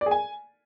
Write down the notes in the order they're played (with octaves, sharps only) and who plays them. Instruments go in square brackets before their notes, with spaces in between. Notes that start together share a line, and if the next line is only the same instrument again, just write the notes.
[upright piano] D5
G#4
G#5